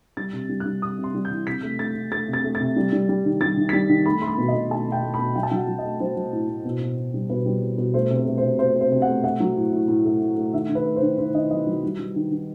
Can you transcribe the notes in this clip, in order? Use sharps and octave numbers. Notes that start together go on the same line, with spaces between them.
G3 A6
C3
G3
F#6
G3
C3 D#6
C3
C6
G3
G6
E3
C3 B6
A3
A3 A6
A3
A3 A6
C3
A6
A3
A6
C3
G3
G3
G3
D#3
G3 A6
D#3
B6
G3 A6
D#3
A3 B5
A3 C6
B5
B2
D#5
B2
A3 A5
B2
G5
A3
B2 B5
F#3 G5
A5
F#3 G5
F#5
F#3
D#5
A3
F#3 C5
F#3
A2
A2
B2
B2
B2
G3
B2 B4
G3
B2
B2
A3 C5
C3
C5
A3
C5
C3
A3 C5
C3
C5
C3
F#5
A3
A3 F#5
F#3
A2
A2
A2
A3
A2
A3
D#3 E5
D#3
B4
A3
C5
D#3
D#3 C5
D#3 D#5
F#3 D#5
F#3
G3
G3
D#3
D#3